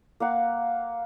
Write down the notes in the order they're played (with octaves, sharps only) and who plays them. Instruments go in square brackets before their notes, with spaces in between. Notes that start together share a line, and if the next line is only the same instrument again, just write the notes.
[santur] A#3 F5 F#5